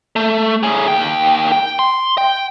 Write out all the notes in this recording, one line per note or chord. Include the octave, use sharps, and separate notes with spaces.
A3
A2 G#4
D#2 G5
G5
C6
G5